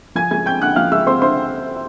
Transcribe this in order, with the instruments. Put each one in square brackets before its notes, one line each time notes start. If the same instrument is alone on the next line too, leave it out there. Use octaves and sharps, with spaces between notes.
[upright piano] F3 G#5 G#6
G#3 G#5 G#6
C4 G5 G6
D3 F#5 F#6
F3 F5 F6
G#3 E5 E6
C4 C5 C6
D3 C5 C6